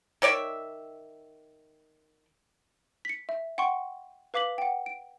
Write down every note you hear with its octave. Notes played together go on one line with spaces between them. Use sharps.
D#3 C#5 D5 E5
B6 C#7
E5
F#5 G5 C6 C#6
B4 F5 D6 B6 F#7
F#5 G5
D7